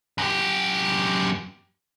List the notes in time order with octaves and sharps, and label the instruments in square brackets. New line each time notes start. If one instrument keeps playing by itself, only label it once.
[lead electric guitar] F#2 G4